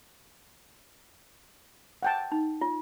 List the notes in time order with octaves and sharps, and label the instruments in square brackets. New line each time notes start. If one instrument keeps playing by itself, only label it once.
[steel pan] F#5 G5 A5
[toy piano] D#4
F4